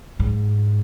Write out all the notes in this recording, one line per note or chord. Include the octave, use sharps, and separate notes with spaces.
G#2